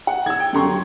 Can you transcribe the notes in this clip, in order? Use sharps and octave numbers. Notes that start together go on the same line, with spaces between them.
F#5
E6 G#6
G5
F#2 D3 G4 A#5 C6 C#6
F#3